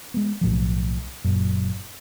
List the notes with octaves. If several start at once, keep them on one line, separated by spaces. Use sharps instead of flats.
G#3 B3
B1 A2 F3
F#1 F#2 A#2